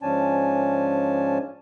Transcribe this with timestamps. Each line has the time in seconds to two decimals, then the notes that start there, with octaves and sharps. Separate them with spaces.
0.02 G#2 F3 C#4 D4 G#5 A5